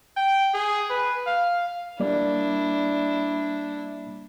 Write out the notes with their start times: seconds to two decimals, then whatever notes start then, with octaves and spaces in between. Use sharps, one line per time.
0.17 G5
0.54 G#4
0.90 B4
1.27 F5
2.00 G3 A#3 D4 E4 D5